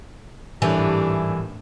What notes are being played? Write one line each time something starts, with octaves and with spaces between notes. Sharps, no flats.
G#1 A2 E3 G3 A3 D4 G#5